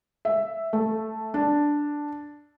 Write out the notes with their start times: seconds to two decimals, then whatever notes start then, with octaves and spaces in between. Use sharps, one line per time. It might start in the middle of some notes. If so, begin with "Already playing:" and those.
0.25 E5
0.73 A3
1.34 D4